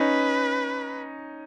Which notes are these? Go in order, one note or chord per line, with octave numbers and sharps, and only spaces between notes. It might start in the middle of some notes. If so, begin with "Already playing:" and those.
Already playing: C#4 D#4 B4